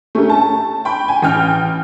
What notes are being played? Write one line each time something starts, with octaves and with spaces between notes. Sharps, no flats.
A3 C#4 G4 A#4
A5
G5 B5
G#5
A1 G5 F6